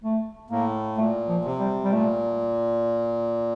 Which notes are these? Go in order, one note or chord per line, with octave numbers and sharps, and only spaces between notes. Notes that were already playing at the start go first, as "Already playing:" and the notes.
A3
A2 A#3
A#2 A3
F3
C3
G3
G3
A#2 A3